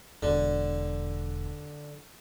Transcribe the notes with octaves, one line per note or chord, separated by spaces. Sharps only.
E1 D3